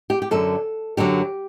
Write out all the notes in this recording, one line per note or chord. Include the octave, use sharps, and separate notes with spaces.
G4
G4
F#2 D3 F#3 A4
F#2 D3 F#3 G4